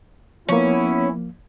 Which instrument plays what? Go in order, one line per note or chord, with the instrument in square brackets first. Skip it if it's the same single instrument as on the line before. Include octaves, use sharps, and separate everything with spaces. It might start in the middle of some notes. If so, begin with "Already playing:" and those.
[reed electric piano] F3 A#3 [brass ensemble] B3 E4 [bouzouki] C#4